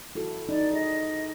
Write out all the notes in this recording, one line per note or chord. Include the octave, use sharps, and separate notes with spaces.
E4 F#4 A4
D#4 D5
G#4 D#5